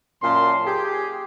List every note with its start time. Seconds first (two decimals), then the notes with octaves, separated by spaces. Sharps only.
0.21 F#2 A#2 A5 C6
0.64 G4 G#4